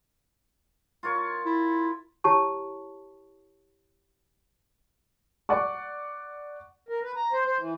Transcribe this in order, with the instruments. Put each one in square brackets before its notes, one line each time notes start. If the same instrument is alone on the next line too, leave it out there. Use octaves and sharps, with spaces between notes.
[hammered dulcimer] F4 A#4 C#5
[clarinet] E4
[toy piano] E4 G4 C#5 A5 C#6
[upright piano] D5 F#5 C#6
[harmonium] A#4
B4
A#5
C5
C5
E3